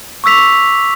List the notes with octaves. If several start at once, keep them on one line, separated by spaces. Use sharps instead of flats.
C#6 D6 E6 B6 F7